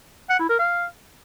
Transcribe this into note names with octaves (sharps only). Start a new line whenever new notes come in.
F#5
E4
A#4
F5